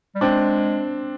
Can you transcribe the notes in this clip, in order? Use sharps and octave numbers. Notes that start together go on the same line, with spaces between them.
G3
G#3 C4 D4